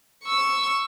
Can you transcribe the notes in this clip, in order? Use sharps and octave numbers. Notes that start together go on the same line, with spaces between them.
C#6 E6